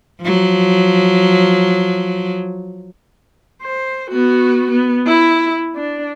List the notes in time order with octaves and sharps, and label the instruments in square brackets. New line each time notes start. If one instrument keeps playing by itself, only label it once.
[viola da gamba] F3 F#3
[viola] C5
B3 F#4
B3
E4
D4